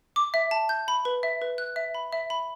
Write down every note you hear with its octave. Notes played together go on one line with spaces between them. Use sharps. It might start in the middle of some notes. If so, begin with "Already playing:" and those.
D6
E5
A5
G6
B5
B4
E5
B4
F#6
E5
B5
E5
B5